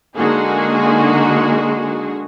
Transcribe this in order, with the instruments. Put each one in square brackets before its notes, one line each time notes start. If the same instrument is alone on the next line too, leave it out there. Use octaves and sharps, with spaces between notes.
[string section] D3 G#3 A#3 D#4 F#4 G#4